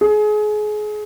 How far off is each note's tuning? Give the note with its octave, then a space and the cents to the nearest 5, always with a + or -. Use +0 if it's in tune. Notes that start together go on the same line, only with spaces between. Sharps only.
G#4 +30